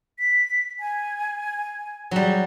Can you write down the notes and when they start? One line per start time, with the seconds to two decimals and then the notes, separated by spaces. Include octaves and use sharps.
0.19 B6
0.80 G#5
2.11 F#3 G3 G#4